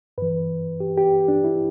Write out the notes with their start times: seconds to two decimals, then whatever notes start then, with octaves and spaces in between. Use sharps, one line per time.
0.18 G2 E3 B4
0.80 G4
0.97 G4
1.28 D4
1.44 E4